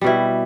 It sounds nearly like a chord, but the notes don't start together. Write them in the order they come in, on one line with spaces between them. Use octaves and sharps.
G3 B2 E4